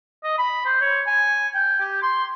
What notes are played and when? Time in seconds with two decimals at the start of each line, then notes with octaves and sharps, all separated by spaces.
0.23 D#5
0.38 B5
0.65 C5
0.81 C#5
1.07 G#5
1.54 G5
1.80 G4
2.02 C6